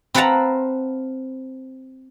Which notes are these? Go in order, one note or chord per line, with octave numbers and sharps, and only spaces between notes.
C4 B4 F5 F#5 A5 A#5